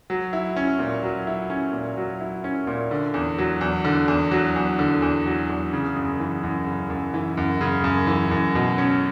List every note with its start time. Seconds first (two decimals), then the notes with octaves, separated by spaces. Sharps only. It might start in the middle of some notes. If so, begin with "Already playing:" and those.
0.10 F#3
0.33 E4
0.56 C#4
0.79 A#2
1.03 F#3
1.27 E4
1.50 C#4
1.73 A#2
1.97 F#3
2.21 E4
2.44 C#4
2.67 A#2
2.91 D3
3.14 E2
3.38 F#3
3.61 E2
3.85 D3
4.08 E2
4.31 F#3
4.56 E2
4.79 D3
5.02 E2
5.26 F#3
5.49 E2
5.73 C#3
5.96 F#2
6.20 E3
6.43 F#2
6.67 C#3
6.90 F#2
7.14 E3
7.37 F#2
7.61 C#3
7.84 F#2
8.07 E3
8.31 F#2
8.55 B2
8.78 C#4